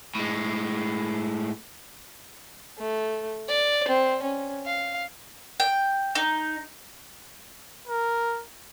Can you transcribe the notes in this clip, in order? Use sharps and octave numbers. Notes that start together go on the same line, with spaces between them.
A2 G#3
A3
D5
C4
C#4
F5
G5
D#4
A#4